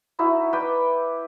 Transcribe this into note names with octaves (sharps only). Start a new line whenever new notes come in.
D#4 E4 F#4
B4 D5 G5